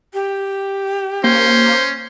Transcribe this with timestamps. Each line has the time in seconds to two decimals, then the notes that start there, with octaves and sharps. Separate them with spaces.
0.14 G4
1.24 A#3 C#4 C5